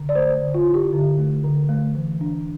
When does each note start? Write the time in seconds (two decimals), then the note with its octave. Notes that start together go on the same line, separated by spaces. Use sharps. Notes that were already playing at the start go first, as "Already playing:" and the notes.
Already playing: D3
0.09 D5
0.15 A3 C5
0.42 D3
0.54 F4
0.67 E4
0.74 G4
0.92 D3
1.18 A3
1.44 D3
1.69 A3
1.95 E3
2.21 D4